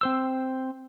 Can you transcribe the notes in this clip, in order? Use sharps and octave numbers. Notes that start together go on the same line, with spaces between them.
C4 C5 E6